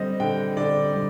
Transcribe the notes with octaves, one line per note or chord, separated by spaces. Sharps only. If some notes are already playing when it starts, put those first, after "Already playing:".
Already playing: D3 G3 C4 D#5
D3 G5
D3 D5
G3